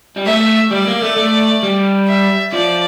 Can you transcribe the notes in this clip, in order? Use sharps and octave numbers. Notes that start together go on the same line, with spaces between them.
G3
A3 E5
G3 D5
A#3
A3
A3
G3
E5
F3 D5